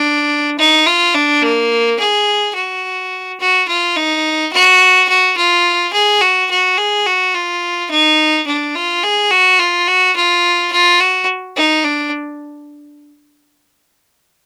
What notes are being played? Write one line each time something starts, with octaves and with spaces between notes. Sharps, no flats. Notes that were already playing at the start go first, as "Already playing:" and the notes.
Already playing: D4
D#4
F4
D4
A#3
G#4
F#4
F#4
F4
D#4
F#4
F#4
F4
G#4
F#4
F#4
G#4
F#4
F4
D#4
D4
F4
G#4
F#4
F4
F#4
F4
F4
F#4
D#4
D4